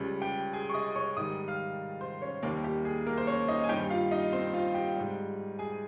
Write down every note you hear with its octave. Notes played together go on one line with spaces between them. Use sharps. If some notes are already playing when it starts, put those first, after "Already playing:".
Already playing: C#2 C#3 G3
G4 G5
G#4 G#5
C#6
D#5 D#6
C#5 C#6
G#2 D#3 G3 D#5 D#6
F5 F6
C5 C6
C#4 C#5
D#2 D#3 G3 A#3 A#4
G4
G#4
A#3 A#4
C5
C#4 C#5
D#4 D#5
G#5
G2 D#3 G3 G4 G5
F4 F5
D#4 D#5
C4 C5
F4 F5
G4 G5
G#2 G3
G#4 G#5